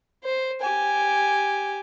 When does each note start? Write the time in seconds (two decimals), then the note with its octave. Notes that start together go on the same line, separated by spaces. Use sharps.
0.24 C5
0.61 G4 G#5